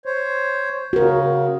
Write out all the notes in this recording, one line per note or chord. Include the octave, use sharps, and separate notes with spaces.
C5 C#5
C#3 F#4 A#4